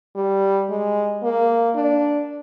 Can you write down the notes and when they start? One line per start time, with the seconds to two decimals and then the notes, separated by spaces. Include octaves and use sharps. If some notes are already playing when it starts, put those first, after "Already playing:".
0.16 G3
0.70 G#3
1.23 A#3
1.75 D4